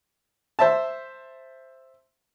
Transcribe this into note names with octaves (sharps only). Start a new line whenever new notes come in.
C5 E5 A5